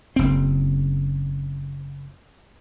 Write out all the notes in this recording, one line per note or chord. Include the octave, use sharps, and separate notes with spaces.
F#1 C4